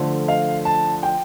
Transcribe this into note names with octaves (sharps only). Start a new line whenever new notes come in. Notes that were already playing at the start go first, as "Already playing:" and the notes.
Already playing: D3 F3 A3
F5
A5
G5